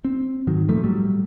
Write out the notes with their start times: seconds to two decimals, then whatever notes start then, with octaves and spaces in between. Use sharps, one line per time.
0.05 C4
0.47 G#2 D#3 F#3
0.69 A#2 F3 A3
0.84 A2 F#3 G3